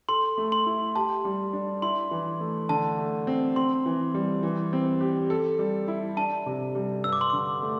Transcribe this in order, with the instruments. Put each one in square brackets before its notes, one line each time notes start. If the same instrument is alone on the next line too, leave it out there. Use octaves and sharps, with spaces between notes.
[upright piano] A4 [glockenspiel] C6
[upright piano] A3
[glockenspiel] C6
[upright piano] E4
[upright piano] G4 [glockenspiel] A5
[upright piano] G3
D4
[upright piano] E4 [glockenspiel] C6
[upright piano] E3
A3
[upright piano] D3 [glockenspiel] A5
[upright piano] A3
C4
[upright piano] C4 [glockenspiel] C6
[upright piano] E3
G3
E3
C4
G4
A4
G3
E4
[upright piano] D4 [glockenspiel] A5
[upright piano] C3
G3
[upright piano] G2 [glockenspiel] E6
[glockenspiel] D6
C6
[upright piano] D3 [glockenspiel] D6
[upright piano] A3